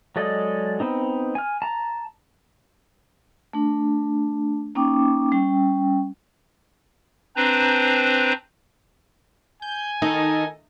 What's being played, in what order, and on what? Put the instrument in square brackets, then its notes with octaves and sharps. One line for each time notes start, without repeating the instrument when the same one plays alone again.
[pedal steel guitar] F#3 G#3 A4 D5 D#5
B3 C4 D#4
G#5 F6
A5 A#5
[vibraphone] A3 D4
A#3 C#4 D#4 G5 D6
G3 C#4 G5
[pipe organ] C4 D4 B4 C5 A#5
[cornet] G#5 [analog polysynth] G6
[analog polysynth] D#3 A4 D#5 [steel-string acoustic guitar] D#4